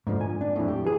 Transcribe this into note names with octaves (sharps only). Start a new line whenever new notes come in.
G#2 D3 F3
G#5
D4
F2 A2
G4
E3 G#4